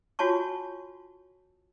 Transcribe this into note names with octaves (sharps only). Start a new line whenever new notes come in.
F4 F#4 C#5 G#5 A5 C#6